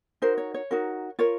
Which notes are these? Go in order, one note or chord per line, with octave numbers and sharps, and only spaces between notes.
D#4 F#4 A#4 C5
C#5
C#5
D#4 F#4 A#4
F4 A#4 C#5